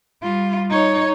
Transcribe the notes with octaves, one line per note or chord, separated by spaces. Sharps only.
G3 F4
D#4 C#5